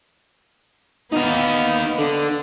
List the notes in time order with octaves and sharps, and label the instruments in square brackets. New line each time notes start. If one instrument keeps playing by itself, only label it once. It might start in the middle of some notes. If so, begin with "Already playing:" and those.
[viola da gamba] B3 [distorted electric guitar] D#4 F5
[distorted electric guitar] D3